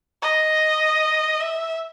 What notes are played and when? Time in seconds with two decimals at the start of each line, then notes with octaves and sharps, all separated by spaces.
0.22 D#5
1.40 E5